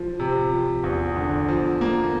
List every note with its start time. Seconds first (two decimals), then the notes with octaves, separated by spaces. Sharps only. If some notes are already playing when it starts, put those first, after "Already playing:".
Already playing: F3
0.19 C3
0.52 F3
0.83 E2
1.16 D3
1.49 F3
1.81 A#3